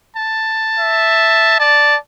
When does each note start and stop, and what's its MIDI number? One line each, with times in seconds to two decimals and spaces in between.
0.16 1.58 81
0.79 1.57 76
1.60 1.97 74
1.60 1.97 81